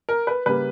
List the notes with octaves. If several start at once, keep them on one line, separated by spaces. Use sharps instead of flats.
A#4
B4
C#3 G3 A#3 B4